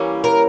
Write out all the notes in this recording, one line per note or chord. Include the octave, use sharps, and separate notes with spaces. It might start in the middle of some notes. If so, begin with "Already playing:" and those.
Already playing: E3 G3 A#3 C#4
A#4